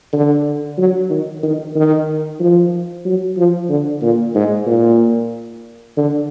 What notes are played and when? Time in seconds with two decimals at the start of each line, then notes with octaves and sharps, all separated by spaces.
0.13 D3
0.78 F#3
1.10 D#3
1.43 D#3
1.75 D#3
2.40 F3
3.05 F#3
3.37 F3
3.69 D3
4.02 A#2
4.35 G#2
4.67 A#2
5.97 D3